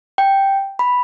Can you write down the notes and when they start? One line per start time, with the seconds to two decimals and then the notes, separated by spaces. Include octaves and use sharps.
0.18 G5
0.79 B5